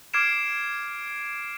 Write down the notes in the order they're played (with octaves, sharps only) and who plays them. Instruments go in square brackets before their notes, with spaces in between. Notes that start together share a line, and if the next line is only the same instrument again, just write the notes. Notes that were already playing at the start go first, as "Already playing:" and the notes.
[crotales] D6 F6 G#6 C7 D7 E7